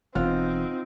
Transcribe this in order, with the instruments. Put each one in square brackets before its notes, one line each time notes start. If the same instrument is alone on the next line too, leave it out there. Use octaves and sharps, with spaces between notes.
[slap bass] E1 [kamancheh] C4 D#4 [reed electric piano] F4 F#5 F6